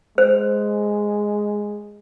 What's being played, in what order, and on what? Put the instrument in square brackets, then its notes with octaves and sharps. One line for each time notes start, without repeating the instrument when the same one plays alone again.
[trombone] G#3 [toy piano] C5